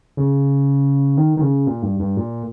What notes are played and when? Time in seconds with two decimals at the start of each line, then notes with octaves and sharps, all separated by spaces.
0.17 C#3
1.17 D#3
1.37 D#3
1.41 C#3
1.67 A#2
1.83 G2
2.00 G2
2.17 A#2